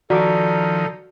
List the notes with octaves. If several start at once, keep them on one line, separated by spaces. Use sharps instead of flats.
D#3 F3 F#4 A4 D5 A#5 D6 B6